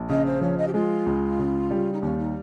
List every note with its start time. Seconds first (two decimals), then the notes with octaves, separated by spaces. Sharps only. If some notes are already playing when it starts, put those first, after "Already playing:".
Already playing: A#1
0.09 C#3 D#5
0.26 C5
0.41 F3 C#5
0.58 D#5
0.68 G4
0.74 G#3 F4
1.06 C#2
1.39 C#3
1.71 G3
1.93 D#4
2.02 D#2 C#4
2.18 D#4